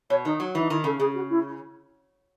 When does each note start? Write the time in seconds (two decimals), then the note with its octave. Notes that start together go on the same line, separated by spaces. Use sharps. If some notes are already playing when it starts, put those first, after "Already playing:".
0.10 B2 C#5
0.25 D#3 D#4
0.40 F#3
0.55 E3 D#4
0.70 D#3 E4
0.84 C#3 A4
0.99 C#3 G#4
1.15 F#4
1.29 E4